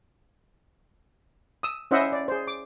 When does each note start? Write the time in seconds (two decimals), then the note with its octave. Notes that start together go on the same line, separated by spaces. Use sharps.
1.63 D#6 E6
1.91 C#4 E4 C5 D#5 E5 F#5
2.12 D5
2.28 G#4 C5
2.47 D6